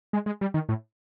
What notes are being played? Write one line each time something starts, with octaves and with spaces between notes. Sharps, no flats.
G#3
G#3
G3
D#3
A2